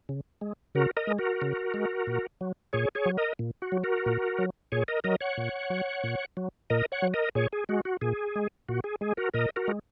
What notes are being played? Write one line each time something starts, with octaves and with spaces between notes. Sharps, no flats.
C#3
G#3
C#3 F#4 A#4
A#4 D#5
G#3
F#4 A#4
C#3
G#3
A#2
F#3
A#2 G#4 C#5
G#4 C#5
F#3
A#4 D#5
A#2
F#4
F#3
F#4 A#4
A#2
F#3
A#2 G#4 C#5
A#4 D#5
F#3 A#4 D#5
C#5 F#5
A#2
F#3
A#2
F#3
A#2 A#4 D#5
C#5 F#5
F#3
A#4 D#5
A#2 G#4 C#5
G#4
G#3 F#4
F#4
A#2 G#4
G#3
A#2 F#4
G#4
G#3 G#4
F#4 A#4
A#2 A#4 D#5
F#4 A#4
G#3